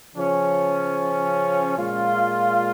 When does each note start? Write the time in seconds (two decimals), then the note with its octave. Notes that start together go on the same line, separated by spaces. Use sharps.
0.15 C#3 F3 C#4
1.76 A#2 G#3 F4